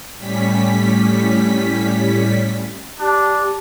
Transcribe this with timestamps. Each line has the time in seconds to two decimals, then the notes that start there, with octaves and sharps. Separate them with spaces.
0.18 A2 G3 C#4 B6
3.00 D4 G4